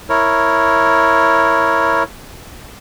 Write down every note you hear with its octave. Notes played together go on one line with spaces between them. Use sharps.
E4 A#4 C#5